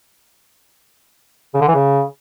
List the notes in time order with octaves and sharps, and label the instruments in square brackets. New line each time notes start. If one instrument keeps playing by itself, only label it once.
[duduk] C#3
D3
E3
C#3